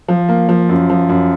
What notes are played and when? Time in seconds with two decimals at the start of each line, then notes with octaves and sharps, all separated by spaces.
0.08 F3
0.29 A#3
0.49 F3
0.69 F#2
0.90 F3
1.09 F#2